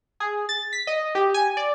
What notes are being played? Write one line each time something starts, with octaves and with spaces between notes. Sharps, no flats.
G#4
A6
B6
D#5
G4
G#5
D5